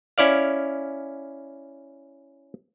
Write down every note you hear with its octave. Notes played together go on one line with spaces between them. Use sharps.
C#4 E4 D5 F5